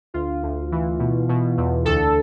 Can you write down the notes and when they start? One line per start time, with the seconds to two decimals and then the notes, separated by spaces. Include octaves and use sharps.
0.14 D2 F4
0.43 D2
0.72 E3
0.99 B2
1.29 B2
1.57 E2
1.85 D2 A4